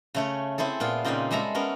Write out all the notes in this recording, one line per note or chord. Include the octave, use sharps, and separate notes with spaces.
C#3 A3 C#5
C4 E4 G#4 A4
A#2 B3 F4
A#2 C#3 C4 D#4 D5 G#5
G3 G#3 A4 E5 A#5 B5
B3 C#4 A#4